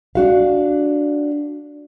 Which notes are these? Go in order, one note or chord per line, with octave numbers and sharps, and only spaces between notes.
D4 F#4 F5